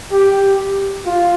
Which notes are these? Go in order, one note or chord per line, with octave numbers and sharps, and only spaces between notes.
G4
F4